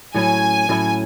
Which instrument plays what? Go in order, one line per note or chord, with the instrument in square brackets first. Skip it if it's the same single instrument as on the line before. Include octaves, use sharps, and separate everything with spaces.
[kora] A2 F#3 C#4 E4 [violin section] G#5
[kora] A2 F#3 C#4 E4